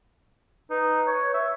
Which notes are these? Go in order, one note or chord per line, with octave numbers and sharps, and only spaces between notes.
D#4 B4
C#5
E5